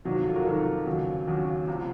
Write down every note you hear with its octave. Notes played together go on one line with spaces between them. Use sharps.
F2 C3 D#3 F#3 F4
F#4
F4 A4
F#4 A#4
F2 C3 D#3 F#3 F4 A4
D#2 C#3 F#3
D#2 C#3 F#3
C2 C3 F3